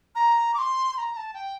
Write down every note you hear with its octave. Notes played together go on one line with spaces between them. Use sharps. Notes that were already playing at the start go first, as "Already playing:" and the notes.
A#5
D6
C6
C6
A#5
A#5
A5
G5